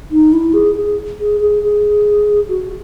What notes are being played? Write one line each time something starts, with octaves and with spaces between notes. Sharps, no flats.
D#4
E4
G#4
G#4
G#4
G#4
G#4
F#4